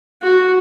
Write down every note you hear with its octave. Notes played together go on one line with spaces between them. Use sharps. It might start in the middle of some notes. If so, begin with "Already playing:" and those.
F#4